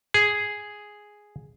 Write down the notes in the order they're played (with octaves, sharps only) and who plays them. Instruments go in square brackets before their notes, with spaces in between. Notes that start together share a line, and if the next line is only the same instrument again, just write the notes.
[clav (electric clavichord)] G#4